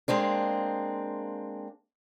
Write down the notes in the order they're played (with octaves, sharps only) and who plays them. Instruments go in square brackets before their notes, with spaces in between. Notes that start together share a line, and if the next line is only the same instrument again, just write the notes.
[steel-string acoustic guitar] G#3 A#3 C4 D4